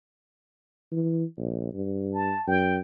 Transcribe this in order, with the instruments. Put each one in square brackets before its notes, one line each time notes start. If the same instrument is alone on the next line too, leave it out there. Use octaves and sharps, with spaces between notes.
[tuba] E3
A#1
G2
[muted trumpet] A5
[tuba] F#2 [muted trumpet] G5